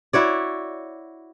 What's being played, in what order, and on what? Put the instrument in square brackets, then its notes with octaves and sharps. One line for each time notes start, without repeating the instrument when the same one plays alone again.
[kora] E4 F#4 C#5 D5